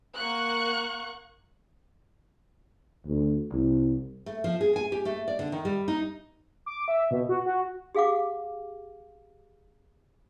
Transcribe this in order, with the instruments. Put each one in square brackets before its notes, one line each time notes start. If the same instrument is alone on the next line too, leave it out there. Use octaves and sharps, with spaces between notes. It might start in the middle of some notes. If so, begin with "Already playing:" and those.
[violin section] A#3 F#5 C#6 F#6
[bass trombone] D2
C2
[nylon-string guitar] A3
F3
G#4
G#5
G4
A3
D5
D3
D#3
G3
D#4
[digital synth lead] D6
E5
B2
F#4
F#4
[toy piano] G4 G#4 F5 F#5 D6